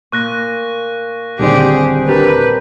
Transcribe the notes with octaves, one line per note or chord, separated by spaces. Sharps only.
A#2 C#6 F#6 A#6
D#1 G2 D3 C4 G4 G#4 D5
D4 G4 A#4 B4